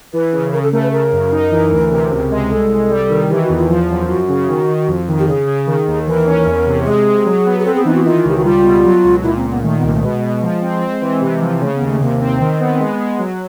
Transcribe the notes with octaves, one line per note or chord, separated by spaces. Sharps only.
E3 B4
C#3
C#3 A#4
A4
A3 A#4
B4
C#3 A#4
F#2
D#4
E3
D2
C3
C#2
G#3
C2 A4
C2
G3
D#3
E3 G4
F#4
E2
F4
F3 F4
F#2
F#2 F#4
C#3
D#3
D#3
F2
D#3
G4
C#3 G#4
C#3
D#3
D#2
E3 A#4
C#4
E2
C3
G#3 G#4
G#3
F#3
B3
G#4
C4 A4
G#4
E3 D#4
F#4
D#3 F4
C#2 G4
F#4
G3 F4
B2
F#3
C#2
A#2 E4
C4
A#2
B3
D#3 A3
B3
C2 A#3
A3
B2 G#3
B2
F3
C4
C4
E3
C3
F3
C#3 A3
B3
D#2
A3
C3 A#3
C4
D#3
B3
G#3
G#3
F#3